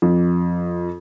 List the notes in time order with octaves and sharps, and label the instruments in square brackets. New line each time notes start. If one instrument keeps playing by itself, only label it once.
[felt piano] F2